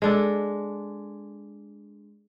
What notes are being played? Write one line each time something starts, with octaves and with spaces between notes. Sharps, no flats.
G#3 D4 A4